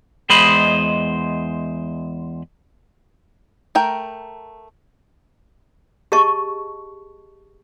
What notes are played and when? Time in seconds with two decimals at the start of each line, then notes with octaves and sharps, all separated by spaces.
0.30 E2 G#3 C5 D#5 B5
3.75 A3 A#4 G5
6.12 G4 G#4 D#5 A5 C#6